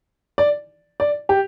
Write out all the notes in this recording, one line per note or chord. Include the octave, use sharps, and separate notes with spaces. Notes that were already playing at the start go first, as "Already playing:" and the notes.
D5
D5
G4